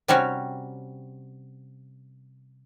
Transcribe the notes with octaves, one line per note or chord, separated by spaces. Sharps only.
C3 G3 C#4 F#4